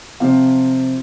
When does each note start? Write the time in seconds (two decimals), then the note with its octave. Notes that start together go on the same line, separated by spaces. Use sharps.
0.20 C3 F3 C4 F5